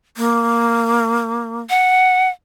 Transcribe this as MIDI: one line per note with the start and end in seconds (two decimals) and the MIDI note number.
0.17 1.61 58
1.70 2.29 78